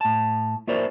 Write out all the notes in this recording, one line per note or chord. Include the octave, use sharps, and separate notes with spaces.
A2 A5
A#3 E4 F#4 A#4 C5 D5